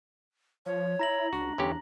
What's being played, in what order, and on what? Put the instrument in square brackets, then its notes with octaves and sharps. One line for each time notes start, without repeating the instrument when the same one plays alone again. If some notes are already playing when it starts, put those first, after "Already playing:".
[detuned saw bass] F3 [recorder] C#5
[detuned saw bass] E4 [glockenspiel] A#5 A#6 F#7
[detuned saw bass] C#2 [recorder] D4 [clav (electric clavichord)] F#4
[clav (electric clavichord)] G1 C#4 G4 [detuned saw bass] E2